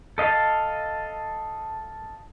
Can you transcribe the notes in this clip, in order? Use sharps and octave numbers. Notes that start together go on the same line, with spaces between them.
A4 D#5 F5 A5